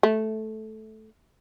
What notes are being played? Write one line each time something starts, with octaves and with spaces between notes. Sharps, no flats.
A3